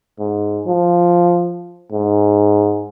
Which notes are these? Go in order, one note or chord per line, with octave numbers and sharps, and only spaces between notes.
G#2
F3
G#2